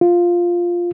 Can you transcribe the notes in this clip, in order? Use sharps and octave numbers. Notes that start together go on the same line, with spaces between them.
F4